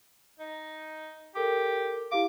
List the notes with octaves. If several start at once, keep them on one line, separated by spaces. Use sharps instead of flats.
D#4
G4 A4 A#4 D6
E4 G4 F5 D6